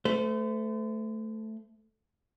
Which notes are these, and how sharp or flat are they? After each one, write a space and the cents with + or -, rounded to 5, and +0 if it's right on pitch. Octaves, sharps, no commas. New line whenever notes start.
A3 +0 C5 -40